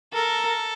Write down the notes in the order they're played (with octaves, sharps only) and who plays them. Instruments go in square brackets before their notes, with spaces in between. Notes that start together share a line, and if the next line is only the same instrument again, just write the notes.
[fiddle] A4 [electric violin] A#4